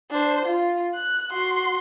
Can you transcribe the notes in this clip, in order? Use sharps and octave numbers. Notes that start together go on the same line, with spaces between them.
D4 C5
F4
F#6
F#4 C6